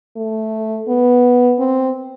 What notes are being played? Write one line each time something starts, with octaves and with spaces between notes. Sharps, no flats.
A3
B3
C4